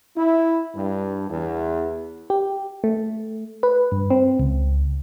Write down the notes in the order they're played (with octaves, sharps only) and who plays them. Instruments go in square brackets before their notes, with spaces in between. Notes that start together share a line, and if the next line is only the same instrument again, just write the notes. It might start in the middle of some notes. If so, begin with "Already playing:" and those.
[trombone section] E4
G2
E2
[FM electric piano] G4
A3
B4
G2
C4
C#2